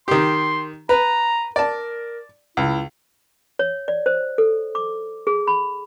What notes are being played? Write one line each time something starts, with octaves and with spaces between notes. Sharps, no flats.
D#3 G4 C6
B4 A#5
A#4 D5 A5
C#2 E4
C#5
D5
C5
A4
D6
G#4
B5